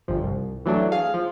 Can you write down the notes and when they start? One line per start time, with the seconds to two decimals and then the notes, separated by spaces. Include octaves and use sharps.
0.08 G1 F3
0.24 C2
0.65 E3 F#3 A3 D4
0.92 G#4 F5
1.14 F3